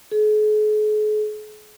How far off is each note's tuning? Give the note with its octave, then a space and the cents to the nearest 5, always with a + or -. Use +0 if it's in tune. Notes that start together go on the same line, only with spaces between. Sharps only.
G#4 +45